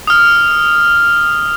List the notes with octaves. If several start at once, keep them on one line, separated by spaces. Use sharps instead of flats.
D#6 F6